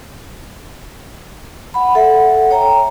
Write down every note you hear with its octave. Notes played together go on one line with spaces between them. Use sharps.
F#5 B5
A4 E5 F#5
C#5 G5 A#5